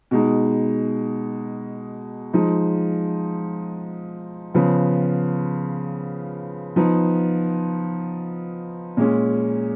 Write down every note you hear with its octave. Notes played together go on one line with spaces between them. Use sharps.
B2 G#3 D#4
F3 G#3 D#4
C#3 F3 B3
F3 B3 D#4
A#2 G#3 C#4